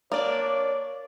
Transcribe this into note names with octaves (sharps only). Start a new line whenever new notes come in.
A#3 D4 C#5 D5